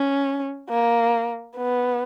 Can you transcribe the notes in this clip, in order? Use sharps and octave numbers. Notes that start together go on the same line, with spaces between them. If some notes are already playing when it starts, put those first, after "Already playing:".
Already playing: C#4
A#3
B3